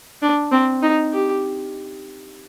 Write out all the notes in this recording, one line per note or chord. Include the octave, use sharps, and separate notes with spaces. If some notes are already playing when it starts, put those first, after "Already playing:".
D4
C4
D#4
G4